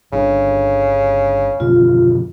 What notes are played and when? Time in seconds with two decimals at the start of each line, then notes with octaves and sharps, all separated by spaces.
0.13 G1 C#3 D4
1.60 F#2 B2 D3 F4